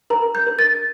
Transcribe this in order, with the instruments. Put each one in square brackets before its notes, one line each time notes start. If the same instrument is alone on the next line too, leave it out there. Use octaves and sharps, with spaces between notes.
[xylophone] A#4 A#5
G6
A#4
A6